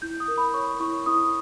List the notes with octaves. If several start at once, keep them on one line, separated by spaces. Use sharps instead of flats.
E4 G6
D#6
A#4
B5
C#5 C#6
E4 C#6
E4 D#6